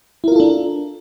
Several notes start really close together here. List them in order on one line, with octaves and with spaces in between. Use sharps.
E4 A#4 F4 A4 D4